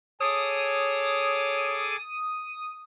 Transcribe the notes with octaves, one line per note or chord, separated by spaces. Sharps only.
G#4 A4 C#5 D6 D#6